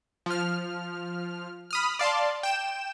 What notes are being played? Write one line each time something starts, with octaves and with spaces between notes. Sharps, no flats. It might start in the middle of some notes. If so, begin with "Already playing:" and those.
F3 F6
B5 D#6 F6
D5 F5 A5 C6
G5 E7